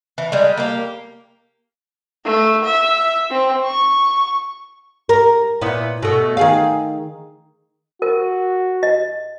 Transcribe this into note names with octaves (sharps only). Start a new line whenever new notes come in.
E3
G3 G#3
A#3 G4
A3
E5
C4
C#6
A#4
A#2 B3 E4
B2 A3
D#3 G#4 F5
F#4 A#4
D#5